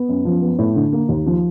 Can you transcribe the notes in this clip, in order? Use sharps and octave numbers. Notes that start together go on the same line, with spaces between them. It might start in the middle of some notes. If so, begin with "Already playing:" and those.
Already playing: B3
F#2
F3
B3
A2
D3
A#3
D#2
F3